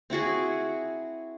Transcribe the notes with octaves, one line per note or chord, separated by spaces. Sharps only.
C4 E4 F#4 G#4